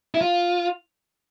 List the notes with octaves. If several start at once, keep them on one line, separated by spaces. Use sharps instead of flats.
E4
F4